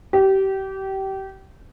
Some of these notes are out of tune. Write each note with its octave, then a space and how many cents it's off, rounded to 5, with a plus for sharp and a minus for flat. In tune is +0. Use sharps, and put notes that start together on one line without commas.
G4 -25